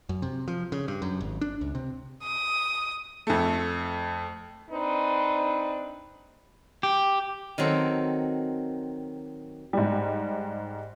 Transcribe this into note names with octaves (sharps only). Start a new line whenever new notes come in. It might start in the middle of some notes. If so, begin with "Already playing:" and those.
F#2
C3
F3
C#3
G2
F#2
G#1
D4
C#2
C3
D#6
F2 A3
C4 D4 D#4 B4
G4
D#3 F#3 C4 A4
G#2 G3